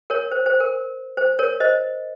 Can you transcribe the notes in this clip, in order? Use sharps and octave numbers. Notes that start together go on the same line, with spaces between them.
A#4 C#5
C5
C5
A#4
C5
A#4 C#5
C5 D#5